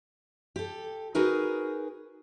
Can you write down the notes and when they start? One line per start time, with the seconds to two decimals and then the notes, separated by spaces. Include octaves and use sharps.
0.56 G4 A4
1.15 D#4 F#4 G#4 A#4 B4